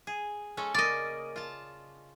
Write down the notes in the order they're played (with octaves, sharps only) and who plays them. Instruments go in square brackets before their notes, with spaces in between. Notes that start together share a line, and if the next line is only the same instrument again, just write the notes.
[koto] G#4
G#3 C#4 A4
[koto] C#3 A#3 [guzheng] D5 D#5
[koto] F4 A5